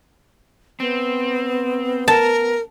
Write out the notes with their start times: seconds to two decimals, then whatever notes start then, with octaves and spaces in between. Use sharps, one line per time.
0.80 B3 C4
2.08 A#4 A5